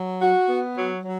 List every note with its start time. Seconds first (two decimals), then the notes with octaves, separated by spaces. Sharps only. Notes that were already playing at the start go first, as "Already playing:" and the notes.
Already playing: F#3
0.21 F#4
0.49 B3
0.76 F#3
1.04 F#3